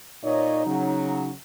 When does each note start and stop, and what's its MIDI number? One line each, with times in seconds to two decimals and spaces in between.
0.23 0.63 46
0.23 1.30 63
0.23 0.63 73
0.23 0.63 75
0.66 1.31 49
0.66 1.31 54